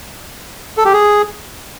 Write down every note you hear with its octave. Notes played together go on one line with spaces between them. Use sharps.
A4
G4
G#4